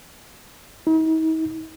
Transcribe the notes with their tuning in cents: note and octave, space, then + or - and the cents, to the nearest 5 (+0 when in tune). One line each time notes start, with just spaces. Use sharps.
D#4 +45